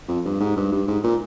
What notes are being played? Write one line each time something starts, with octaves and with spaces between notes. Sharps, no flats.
F2
G2
G#2
G2
G2
G#2
A#2